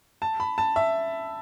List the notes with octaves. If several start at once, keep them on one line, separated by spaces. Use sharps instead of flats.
A5
B5
A5
E5